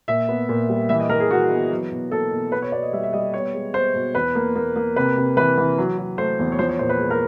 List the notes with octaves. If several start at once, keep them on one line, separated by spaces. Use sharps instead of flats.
A#2 E5
B3
A#2
G3
E3 E5
D#5
E3 A#4
G#4
E3 F#4
B3
F#3
B2
A#3 A4
B2
B3 B4
C#5
B2 D5
D#5
G3 E5
E5
G3 D#5
B3 C#5
G#3
B3 C5
B2
E2 B4
A#3
A#3
A#3
C3 B4
C3
E3 B4
E3
F#3
F#3
A3 C5
E2
C#5
F3 C5
C#5
A#2 C5
B4
G#3
A#4